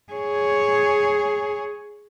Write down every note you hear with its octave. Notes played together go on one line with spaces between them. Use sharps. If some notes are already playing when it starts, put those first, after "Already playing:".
G#4 C#5